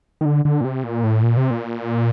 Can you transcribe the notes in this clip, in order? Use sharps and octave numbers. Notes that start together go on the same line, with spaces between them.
D#3
D3
D3
A#2
C3
A#2
A2
A#2
C3
A#2